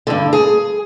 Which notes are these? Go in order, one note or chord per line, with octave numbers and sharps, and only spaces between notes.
G2 D3
G#4